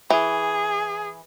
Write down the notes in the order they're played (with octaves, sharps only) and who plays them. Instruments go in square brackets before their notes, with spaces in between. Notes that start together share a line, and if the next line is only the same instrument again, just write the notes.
[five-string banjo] E3 [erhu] G#4